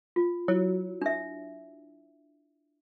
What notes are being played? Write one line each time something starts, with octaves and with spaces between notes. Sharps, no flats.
F4
F#3 E4
D4 E5